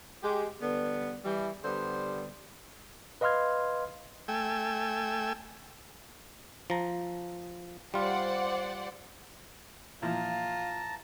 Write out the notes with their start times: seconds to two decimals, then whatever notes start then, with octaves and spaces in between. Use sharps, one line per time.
0.23 G#3 G4
0.62 D3 G3 B3
1.25 E3 G3
1.65 D3 G3 B3 C5
3.21 B4 D#5 F5 C6 F6 G#6
4.28 A3 G5 G#5 E6
6.70 F3 A#5
7.94 G3 F4 C5 D5 F#5
10.02 A#2 E3 F3 F4 A5 A#5